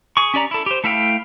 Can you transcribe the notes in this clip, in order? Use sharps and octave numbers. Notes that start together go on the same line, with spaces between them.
G#4 C#6
C#4 G4 D5 A#5
E4 A4
G4 C5
A3 E4 E5 F5 G5